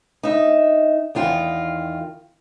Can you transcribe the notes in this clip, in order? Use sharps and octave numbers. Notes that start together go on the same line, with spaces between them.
D#4 E5
E2 D#3 F4 G5